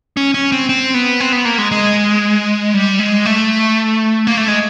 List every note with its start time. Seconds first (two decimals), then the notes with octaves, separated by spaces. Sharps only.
0.17 C#4
0.34 C#4
0.52 C4
0.69 C4
0.94 B3
1.20 C4
1.32 B3
1.45 A#3
1.58 G#3
1.71 G#3
2.74 G3
2.99 G#3
3.26 A3
4.27 A#3
4.38 A3
4.48 G#3